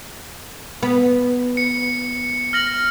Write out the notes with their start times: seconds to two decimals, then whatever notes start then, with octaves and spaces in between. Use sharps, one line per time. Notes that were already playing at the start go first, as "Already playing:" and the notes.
0.83 B3
1.57 C#7
2.53 F6 A#6 F#7